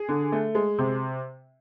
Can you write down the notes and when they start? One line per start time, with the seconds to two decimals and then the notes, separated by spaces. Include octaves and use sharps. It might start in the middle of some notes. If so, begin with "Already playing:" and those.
Already playing: G#4
0.09 D3
0.32 A3
0.55 G#3
0.78 C3